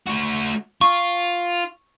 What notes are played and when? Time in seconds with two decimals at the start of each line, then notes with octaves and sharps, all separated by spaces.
0.06 A3 F#4
0.81 F4 C#6